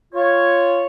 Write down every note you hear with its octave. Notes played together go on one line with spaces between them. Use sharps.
F4 C#5